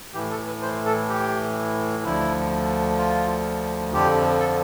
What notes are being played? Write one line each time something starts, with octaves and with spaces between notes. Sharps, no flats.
A2 E3 G4
A4
B4
C5
A4
G4
D2 D3 F3 E4
F4
F2 D3 F3 G4
A4